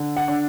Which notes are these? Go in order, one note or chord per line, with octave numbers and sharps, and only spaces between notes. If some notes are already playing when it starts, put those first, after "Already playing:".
Already playing: D3
F#5
D4